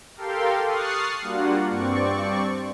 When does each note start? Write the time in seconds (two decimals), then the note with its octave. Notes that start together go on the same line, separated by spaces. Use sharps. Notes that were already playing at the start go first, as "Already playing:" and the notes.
0.16 G4 A4 A#4 F5 G5 C6
0.66 C#6 D#6 F6 F#6 A6 C7
1.21 G3 A#3 D4 F4 F#4 F#5
1.69 G2 C4 D5 C#6